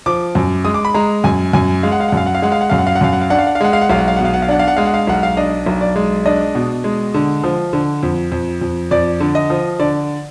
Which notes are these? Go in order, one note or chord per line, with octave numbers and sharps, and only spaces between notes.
F3 D6
F#2
G#3 D#6
D6
B5
G#3 A#5
F#2 G#5
F#2 G#5
G#3 F5
F#5
F5
F#5
F#2 F5
F#5
F5
G#3 F#5
F5
F#5
F#2 F5
F#5
F5
F#5
F#2 F5
F#5
F5
D4 F#5
F5
F#5
F5
G#3 F#5
F5
F#5
B1 F5
F#5
F5
B2 F#5
F5
F#5
F5
D4 F#5
F5
F#5
G#3 F5
F#5
F5
B1 F#5
F5
D4 D#5
B1
D5
G#3
D4 D#5
B2
G#3
D3
F3
D3
F2
F2
F2
F2 D5
D3
D#5
F3
D3 D5